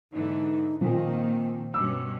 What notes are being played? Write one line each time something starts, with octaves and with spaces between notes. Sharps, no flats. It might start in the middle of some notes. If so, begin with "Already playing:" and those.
G#2 D3 E3 D#4
A#2 D#3 F3 A#3 C4
G2 B2 C#4 D6 E6